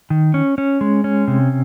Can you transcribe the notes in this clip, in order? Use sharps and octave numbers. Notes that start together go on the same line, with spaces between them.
D#3
C#4
C#4
G#3
C#4
C3